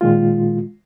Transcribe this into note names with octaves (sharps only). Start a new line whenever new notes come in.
A#2 D#3 G#3 F4